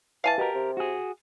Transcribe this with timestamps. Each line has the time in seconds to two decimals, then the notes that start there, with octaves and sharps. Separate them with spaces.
0.24 E3 F5 G#5 A5
0.38 B2 G4 A#4
0.55 C3
0.77 F#4 G#4